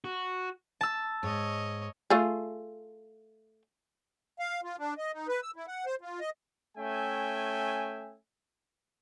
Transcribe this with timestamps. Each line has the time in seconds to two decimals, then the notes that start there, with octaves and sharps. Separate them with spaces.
0.04 F#4
0.81 A5 E6
1.23 G#2 C#5 D#5
2.10 A3 F4 G#4
4.39 F5
4.64 F4
4.78 D4
4.98 D#5
5.13 D#4
5.28 B4
5.43 E6
5.56 E4
5.67 F#5
5.86 C5
6.01 F4
6.20 D#5
6.78 A3 C#4 E5 G5 G#5